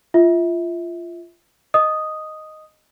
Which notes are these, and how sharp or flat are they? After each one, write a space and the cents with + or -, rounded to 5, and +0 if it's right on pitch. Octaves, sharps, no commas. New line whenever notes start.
F4 -20 E5 -25
D#5 +0 D#6 +0